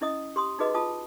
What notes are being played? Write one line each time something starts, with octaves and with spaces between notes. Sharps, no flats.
C#4 E4 D#5 D#6
G4 C6 D#6
D#4 F#4 G#4 B4 D#5
F4 A5 D#6